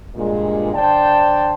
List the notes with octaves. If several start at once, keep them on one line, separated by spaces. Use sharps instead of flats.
G2 A#2 G#3
D3 C5 D5 G5 A5